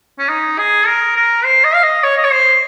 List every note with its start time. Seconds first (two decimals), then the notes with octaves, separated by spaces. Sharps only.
0.19 C#4
0.29 D#4
0.58 G#4
0.87 A#4
1.16 A#4
1.45 C5
1.64 D#5
1.75 F5
1.83 D#5
2.03 C#5
2.17 D#5
2.24 C#5
2.32 C5